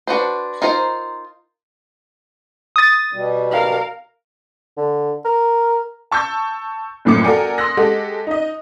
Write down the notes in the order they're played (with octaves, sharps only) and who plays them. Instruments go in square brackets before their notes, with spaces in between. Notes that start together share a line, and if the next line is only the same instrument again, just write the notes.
[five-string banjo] D4 F#4 B4 C5
D#4 F4 A#4 C5
[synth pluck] D#6 A6
[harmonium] B2 G3
[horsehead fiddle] A#4 F5
[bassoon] D3
A#4
[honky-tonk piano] A5 C#6 E6 G6
F#1 F#2 A2 F3 D6 C#7
F#4 A4 A#4 D5 G5 G#5
C6 D#6 E6 F#6 A#6
G#3 G4 A4 F#5
D#4 D#5